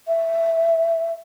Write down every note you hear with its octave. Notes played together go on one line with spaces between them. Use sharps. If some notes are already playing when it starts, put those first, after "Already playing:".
E5